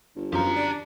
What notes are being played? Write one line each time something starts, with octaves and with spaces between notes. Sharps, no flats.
G1
F#2 D#3 F3 G4 A#5
D4